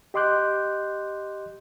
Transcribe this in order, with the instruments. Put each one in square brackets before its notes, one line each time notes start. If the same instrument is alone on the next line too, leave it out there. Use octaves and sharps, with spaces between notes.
[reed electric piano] G4 D#5 C6 D6 F#6 G6